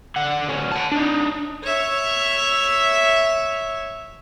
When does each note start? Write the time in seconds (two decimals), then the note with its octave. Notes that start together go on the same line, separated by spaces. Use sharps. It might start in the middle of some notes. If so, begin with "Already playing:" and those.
0.16 D3 F#5
0.48 D2 C#4
0.72 F#5 A5
0.92 D4 D#4
1.64 C#5 E5